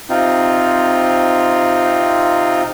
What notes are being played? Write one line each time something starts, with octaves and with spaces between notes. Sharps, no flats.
C3 C4 D#4 F4